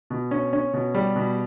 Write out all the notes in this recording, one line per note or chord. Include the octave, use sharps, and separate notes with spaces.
B2
C#4
C#4
B2
G3
B2